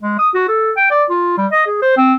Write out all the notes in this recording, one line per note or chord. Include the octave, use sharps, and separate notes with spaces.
G#3
D#6
F#4
A4
G5
D5
F4
G3
D#5
G#4
C5
C4